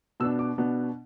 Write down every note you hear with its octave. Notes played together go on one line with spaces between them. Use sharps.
B2 B3 D4 E6
D6
B2 B3 D4